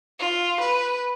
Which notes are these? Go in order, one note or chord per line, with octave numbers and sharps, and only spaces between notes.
F4
B4